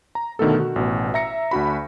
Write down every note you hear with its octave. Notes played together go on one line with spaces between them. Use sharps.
A#5
B2 D3 D#3 A3 B3 A4
F#4
A1 B2
E5 A#5 A#6 C#7
D2 D4 F#4 B5